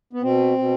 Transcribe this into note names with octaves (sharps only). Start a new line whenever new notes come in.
B3
B2 C4
B2